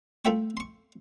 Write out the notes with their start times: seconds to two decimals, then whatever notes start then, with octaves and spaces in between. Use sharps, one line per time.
0.25 A3 F4 A4 E5 G5 C#6
0.57 C6 C#6